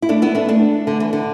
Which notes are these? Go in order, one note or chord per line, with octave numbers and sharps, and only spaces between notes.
E4
A3 D4
B3 E4
A3 D4
A3 D4
D3
E3
D3